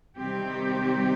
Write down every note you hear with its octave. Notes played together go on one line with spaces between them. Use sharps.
C3 D#3 G3 C4 G4